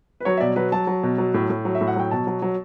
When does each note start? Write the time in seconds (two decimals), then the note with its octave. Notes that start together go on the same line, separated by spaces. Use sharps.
0.20 B4
0.25 F#3 C#5
0.37 E5
0.41 B2 D5
0.56 F#3 B4
0.72 F#3 A5
0.87 F#3
1.03 B2
1.18 F#3
1.34 A2
1.49 A2
1.65 F#3
1.75 E5
1.81 A2
1.87 F#5
1.96 F#3 G5
2.11 B2 A5
2.27 F#3
2.42 F#3